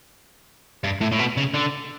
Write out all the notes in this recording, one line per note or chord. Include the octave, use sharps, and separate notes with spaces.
G2
A2
A2
B2
C#3
D3